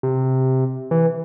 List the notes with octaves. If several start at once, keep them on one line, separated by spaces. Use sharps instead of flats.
C3
E3